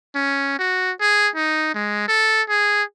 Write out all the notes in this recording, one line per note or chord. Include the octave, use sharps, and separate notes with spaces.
C#4
F#4
G#4
D#4
G#3
A4
G#4